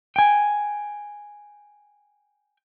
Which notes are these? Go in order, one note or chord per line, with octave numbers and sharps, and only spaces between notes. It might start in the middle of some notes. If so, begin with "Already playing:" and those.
G5 G#5